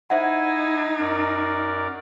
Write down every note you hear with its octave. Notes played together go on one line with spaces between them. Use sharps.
D#4 E4 C5 E5 F#5 G#5
F#2 A#4 D5